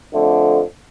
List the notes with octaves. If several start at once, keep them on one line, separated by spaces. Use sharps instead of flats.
F2 D3 F3 A3